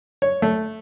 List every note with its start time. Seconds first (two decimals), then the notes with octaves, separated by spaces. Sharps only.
0.22 C#5
0.42 A3